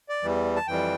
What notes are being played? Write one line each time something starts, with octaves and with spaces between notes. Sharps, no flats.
D5
E2 E3 G3
A5
F2 E3 G3 G5